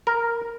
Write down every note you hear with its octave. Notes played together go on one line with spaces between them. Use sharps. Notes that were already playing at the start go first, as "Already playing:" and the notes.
A#4